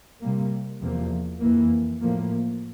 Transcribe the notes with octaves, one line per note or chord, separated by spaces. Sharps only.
C3 G3 A#3
E2 C3 F3 A#3
F2 E3 A#3
A2 F3 A#3